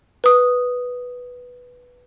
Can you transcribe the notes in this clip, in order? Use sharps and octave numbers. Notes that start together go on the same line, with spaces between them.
B4 D#6